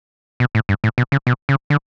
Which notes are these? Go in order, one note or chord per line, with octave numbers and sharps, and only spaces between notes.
B2
A2
G2
A2
B2
C#3
B2
C#3
D3